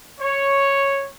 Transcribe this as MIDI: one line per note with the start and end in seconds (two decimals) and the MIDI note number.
0.20 1.10 73